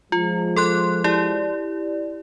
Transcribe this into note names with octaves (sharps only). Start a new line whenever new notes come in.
F3 G#3 F4
A4 C6 F#6
E4 G4 D5